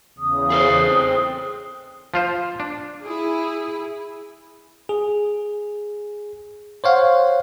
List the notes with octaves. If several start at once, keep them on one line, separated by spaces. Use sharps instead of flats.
E2 C#3 D#6
G#4 A4 C5
C4
F3 F4 C5
D4
E4 G#4
G#4
C5 C#5 F5 F#5